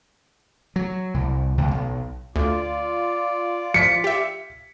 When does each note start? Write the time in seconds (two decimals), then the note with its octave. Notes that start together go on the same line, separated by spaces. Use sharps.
0.76 F#3
1.14 C2
1.58 C#2
1.71 B1
2.36 D2 F4 D5
3.74 F3 B6 C#7
4.04 G4 E5